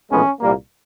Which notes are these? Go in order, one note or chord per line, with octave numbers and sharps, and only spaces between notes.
A#1 A2 E3 G#3 B3 C#4
C2 A#2 G3 A#3